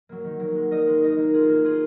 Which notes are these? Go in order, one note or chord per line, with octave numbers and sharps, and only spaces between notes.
F#3 A#3
D#3
F#3 A#3
G#3
D#4 A#4 D#5
G#3
D#4 A#4 D#5
A#3
F4 G#4
A#3
F4 G#4